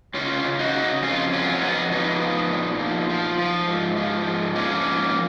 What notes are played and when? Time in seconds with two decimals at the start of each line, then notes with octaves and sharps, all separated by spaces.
0.14 C#3 C#4 F4
0.45 C#3
0.59 D#4 F#4
0.74 C#3
1.02 F2 C#4 F4
1.32 F#3 C#4 F4
1.52 C#4
1.62 F2 B3 D#4
1.91 F3 B3 D#4
2.21 F3
2.51 A#2
2.79 F3
3.09 F3
3.38 F3
3.68 G#2
3.97 F3
4.26 G#2
4.56 F3 A#3 C#4
4.85 G#2